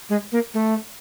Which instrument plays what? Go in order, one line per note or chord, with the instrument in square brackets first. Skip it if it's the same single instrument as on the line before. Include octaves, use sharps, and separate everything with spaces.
[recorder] G#3
A#3
A3